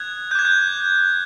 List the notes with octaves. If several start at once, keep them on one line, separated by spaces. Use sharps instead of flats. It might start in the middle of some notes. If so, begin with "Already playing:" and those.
Already playing: D#6 F#6 G#6
D6 F#6 G6 G#6
G6